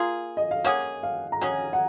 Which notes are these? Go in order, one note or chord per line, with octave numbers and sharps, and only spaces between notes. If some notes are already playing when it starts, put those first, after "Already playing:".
Already playing: A#3 F4 G#4
D#5
F5
A#3 C#4 G#4 F#5
F5
A#5
F#3 C#4 G#4 G#5
F#5